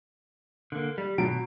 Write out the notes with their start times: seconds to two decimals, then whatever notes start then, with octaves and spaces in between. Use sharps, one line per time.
0.72 D3 A#3
0.98 G3
1.18 B2 F#3 D7